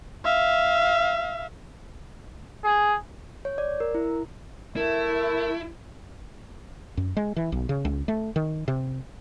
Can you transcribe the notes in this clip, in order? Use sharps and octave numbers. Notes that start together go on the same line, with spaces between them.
E5 F5
G#4
C#5
D5
A#4
E4
A3 E4 A#4
F#2
G#3
E3
B1
C#3
C#2
A3
D#3
C3